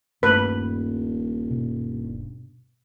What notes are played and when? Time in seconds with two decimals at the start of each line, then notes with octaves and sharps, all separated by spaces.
0.23 D#1 G2 A3 B4
1.51 B2